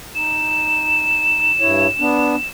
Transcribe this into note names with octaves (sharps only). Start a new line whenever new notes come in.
D#4 E7
G2 E4 C#5
B3 D4